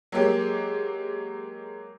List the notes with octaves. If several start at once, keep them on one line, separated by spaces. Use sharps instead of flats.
F#3 G#3 A#3 G4